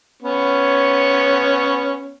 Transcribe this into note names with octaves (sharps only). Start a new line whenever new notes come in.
B3 C#4 C#5